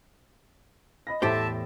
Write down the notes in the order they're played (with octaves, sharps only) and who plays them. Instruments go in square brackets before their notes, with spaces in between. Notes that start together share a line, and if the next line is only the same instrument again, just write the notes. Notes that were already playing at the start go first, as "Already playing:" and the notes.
[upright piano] D#5 B5 A#6
[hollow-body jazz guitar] E2 G4 C5 [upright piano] A2 [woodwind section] A4 E5 A5